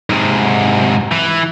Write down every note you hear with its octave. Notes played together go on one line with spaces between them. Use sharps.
G#2 C3
E3